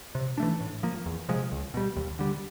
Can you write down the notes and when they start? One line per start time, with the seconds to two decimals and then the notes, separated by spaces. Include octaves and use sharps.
0.15 C3
0.38 E3 A3 D4
0.61 A2
0.83 F3 A#3
1.06 E2
1.29 C3 F3 G#3
1.52 C#2
1.74 B2 G3
1.96 D#2
2.19 D3 G3